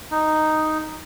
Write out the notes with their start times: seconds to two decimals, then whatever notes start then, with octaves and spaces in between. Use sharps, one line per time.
0.11 D#4